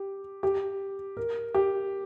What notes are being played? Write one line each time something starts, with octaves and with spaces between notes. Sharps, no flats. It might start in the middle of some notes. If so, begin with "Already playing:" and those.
Already playing: G4
G4
A#4
G4